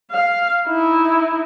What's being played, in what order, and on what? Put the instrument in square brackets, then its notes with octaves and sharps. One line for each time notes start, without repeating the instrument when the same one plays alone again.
[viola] F5
D#4 E4